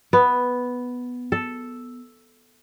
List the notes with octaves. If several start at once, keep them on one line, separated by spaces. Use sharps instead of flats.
B3
A4